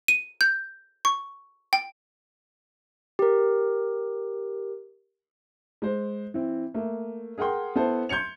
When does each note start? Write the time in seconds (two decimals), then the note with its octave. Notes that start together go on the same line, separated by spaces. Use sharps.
0.08 D#7
0.41 G6
1.05 C#6
1.73 G5
3.19 G4 A#4
5.82 G#3 C5
6.34 E3 C4
6.74 A3 A#3
7.38 G#4 A#4 F#5 G5 C6
7.75 B3 E4 A4 C5
8.09 C6 G6 G#6 C#7 F7